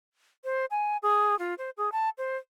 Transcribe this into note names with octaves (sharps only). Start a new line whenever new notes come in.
C5
G#5
G#4
F4
C5
G#4
A5
C5